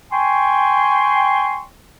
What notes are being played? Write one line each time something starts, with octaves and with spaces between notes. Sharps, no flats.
G5 G#5 C6 C#6